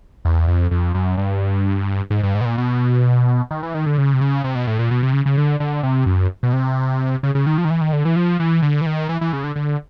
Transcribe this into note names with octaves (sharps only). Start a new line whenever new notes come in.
E2
F2
F2
F#2
G2
G#2
G2
G#2
B2
A#2
B2
D#3
E3
D#3
D3
C#3
C3
C#3
C3
B2
A2
A#2
B2
C3
C#3
C#3
D3
D3
C3
F#2
B2
C3
C#3
C#3
D#3
F3
D#3
E3
D#3
D3
E3
F3
E3
D3
E3
D#3
E3
E3
C#3
D3
D3